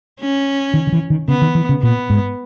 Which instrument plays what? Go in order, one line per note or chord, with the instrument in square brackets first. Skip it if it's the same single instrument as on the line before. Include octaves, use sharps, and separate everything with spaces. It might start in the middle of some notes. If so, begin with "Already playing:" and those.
[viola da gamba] C#4
[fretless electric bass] D#3
D#3
E3
D#3
[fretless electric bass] C#3 [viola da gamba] B3
[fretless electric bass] D#3
E3
C#3
[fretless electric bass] A#2 [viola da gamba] B3
[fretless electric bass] G#2